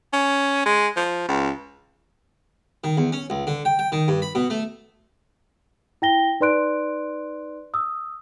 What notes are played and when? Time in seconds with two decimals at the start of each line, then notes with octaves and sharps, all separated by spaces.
0.13 C#4
0.66 G#3
0.97 F3
1.28 C#2
2.84 D#3
2.97 E2
3.12 C#4
3.30 C#2
3.47 D3
3.65 G5
3.79 G5
3.92 D#3
4.08 G2
4.22 B5
4.35 B2
4.50 A3
6.02 E4 G5 A#6 G7
6.40 D#4 B4 D5 C6 F#6 D7
7.74 D#6 E6